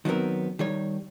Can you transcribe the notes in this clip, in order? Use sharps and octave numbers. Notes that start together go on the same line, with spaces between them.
D#3 F#3 B3 C4 A#4
D#3 G3 C#5